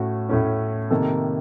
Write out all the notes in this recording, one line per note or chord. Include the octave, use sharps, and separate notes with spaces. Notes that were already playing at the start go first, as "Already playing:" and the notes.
Already playing: A2 A3 C#4 F#4
A2 A3 C#4
C3 D#3 A#3 A4